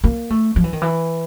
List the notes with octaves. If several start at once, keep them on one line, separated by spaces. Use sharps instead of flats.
A#3
A3
F3
E3
D#3
E3